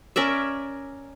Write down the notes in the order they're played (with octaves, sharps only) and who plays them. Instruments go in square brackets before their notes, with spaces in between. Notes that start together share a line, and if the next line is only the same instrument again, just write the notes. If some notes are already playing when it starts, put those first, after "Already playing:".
[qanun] C#4 A#4 D5 E5